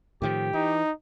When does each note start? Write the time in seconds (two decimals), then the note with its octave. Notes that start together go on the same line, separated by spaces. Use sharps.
0.22 A2 D#3 F3 G4
0.54 E3 D#4